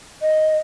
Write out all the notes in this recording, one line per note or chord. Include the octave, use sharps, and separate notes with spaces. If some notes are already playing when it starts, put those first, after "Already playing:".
D#5